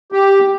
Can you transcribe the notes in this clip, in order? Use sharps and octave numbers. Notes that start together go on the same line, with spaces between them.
G4